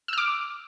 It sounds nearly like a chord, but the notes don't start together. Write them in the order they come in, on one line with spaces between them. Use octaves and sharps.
E6 F6 D6